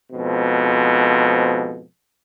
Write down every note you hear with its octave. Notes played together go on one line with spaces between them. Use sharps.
F2 G#2 B2